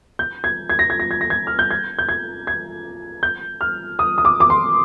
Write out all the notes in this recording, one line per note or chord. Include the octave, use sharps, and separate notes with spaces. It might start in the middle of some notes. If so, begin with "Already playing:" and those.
G6
G#6
G#6
A#6
G#6
A#6
G#6
A#6
G#6
F6
G6
G#6
G6
G#6
G#6
G6
F6
D#6
D#6
D6
D6
C6